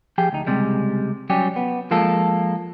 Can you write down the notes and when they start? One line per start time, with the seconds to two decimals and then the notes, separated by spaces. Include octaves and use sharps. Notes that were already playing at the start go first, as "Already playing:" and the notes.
0.18 F3 G4 G#4 G5
0.33 D2 D#4
0.47 C#2 C3 G3 G#3
1.30 F#3 G3 C#4 G4
1.56 B3
1.91 F3 G#3 A#3 F4 A4